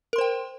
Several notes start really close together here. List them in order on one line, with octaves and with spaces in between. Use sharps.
A#4 C6 C5 G5